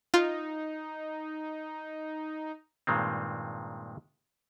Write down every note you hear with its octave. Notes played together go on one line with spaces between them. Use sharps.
D#4 F4
G2 A#2 D#3 G#3 C4